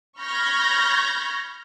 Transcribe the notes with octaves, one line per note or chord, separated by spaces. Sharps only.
B5 C#6 F6 G6 G#6 A#6